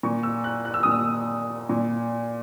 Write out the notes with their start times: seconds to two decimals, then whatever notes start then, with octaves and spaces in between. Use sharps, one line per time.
0.03 A#2 C#6
0.23 E6
0.44 F#6
0.65 F#6
0.74 E6
0.83 A#2 D#6
0.92 E6
1.69 A#2